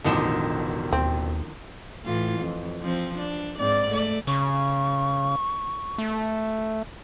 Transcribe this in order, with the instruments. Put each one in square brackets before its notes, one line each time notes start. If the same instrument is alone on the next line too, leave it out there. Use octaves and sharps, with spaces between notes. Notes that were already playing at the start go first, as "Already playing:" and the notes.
[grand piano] E1 A1 E7 [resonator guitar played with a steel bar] D3 D#3 F3
[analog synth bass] D#2 [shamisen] C4
[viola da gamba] A2 E3 F4
F2
F3 C4
D4
G#2 C4 D5
A3 D5
[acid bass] C#3 [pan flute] C#6
[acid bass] A3